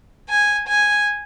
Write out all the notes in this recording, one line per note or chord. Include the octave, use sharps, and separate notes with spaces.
G#5
G#5